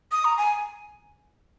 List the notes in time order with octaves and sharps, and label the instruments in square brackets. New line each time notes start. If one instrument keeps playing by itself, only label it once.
[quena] D#6
A#5
G#5